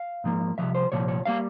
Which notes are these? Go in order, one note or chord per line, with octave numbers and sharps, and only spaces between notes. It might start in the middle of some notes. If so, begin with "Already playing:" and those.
Already playing: F5
G#2 F3 A#3
C2 A#2 F3 E5
C5
C2 A#2 F3 C#5
C#5
G3 A#3 F5